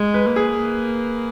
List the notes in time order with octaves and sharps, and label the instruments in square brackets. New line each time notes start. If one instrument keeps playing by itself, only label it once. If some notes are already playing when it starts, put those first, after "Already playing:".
Already playing: [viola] G#3
[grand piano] B4
[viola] A#3
[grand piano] G#4